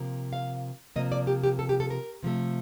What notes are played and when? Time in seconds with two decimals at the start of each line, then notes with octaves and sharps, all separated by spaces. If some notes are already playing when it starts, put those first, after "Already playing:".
Already playing: C3 F3 A#3
0.33 F5
0.96 C3 F3 A#3 D#5
1.12 D5
1.27 G4
1.44 G4
1.59 A4
1.69 G4
1.80 A4
1.90 A#4
2.23 C3 F3 A3